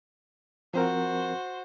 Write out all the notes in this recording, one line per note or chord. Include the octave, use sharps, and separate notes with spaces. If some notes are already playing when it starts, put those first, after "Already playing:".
F3 C4 F#4 A#4 C5